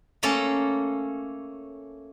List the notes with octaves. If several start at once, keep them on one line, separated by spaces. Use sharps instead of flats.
A3 A#3 C#4 A4